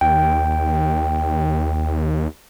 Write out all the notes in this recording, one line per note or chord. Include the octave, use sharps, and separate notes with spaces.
D#2 G5